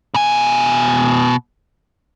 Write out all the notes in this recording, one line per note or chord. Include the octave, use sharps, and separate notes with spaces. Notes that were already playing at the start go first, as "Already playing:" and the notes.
B2 G#5